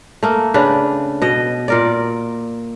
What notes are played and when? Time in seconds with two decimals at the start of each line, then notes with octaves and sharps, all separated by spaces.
0.23 A3 A#3
0.54 C#3 D4 B4
1.22 B2 D#5
1.68 A#2 A#4 D5